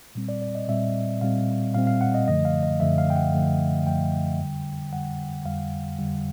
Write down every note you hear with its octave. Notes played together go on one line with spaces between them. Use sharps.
A#2 G3 C4
D5
D5
D#5
A#2 G3 C4 E5
A#2 G3 C4 F5
A#2 G3 C4 F5
F5
F#5
D#5
F#2 D3 F3 A3 D#5
F5
D#5
F#2 D3 F3 A3 E5
F5
G5
F#5
F#2 D3 F3 A3
F#2 D3 F3 A3 G5
F2 D3 G3
F2 D3 G3 F#5
F2 D3 G3 F5
F2 D3 G3